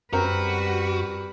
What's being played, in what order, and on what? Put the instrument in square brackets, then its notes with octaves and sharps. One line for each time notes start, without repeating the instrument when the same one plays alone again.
[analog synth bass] F#2 [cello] G3 B4 [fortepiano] C4 A#4 [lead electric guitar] F#4